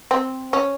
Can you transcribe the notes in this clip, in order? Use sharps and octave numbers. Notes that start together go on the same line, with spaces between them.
C4
C#4